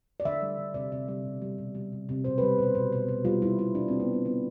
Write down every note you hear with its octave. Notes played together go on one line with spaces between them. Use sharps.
D5
D3 E5
G3
D3
C3 D5
C3 E5
G3 E5
B2
G3
B2
G3
C3
C3
B2 C5
G3 B4
B2 C5
B2
B2
B2
G3 F4
G3 E4
B2 E4
G3 D4
G3 C4
B3
G3 C4
D3 B3